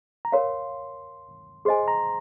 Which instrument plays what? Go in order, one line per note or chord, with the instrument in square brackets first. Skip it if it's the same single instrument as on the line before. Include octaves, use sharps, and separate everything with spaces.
[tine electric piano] A#5
[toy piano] A#4 C#5 F5 [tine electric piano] C6
[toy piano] G#4 C5 D#5 G#5 [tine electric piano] C6
[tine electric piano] A#5